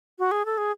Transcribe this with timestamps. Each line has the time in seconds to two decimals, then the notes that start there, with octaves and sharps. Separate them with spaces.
0.19 F#4
0.31 G#4
0.46 A4
0.58 G#4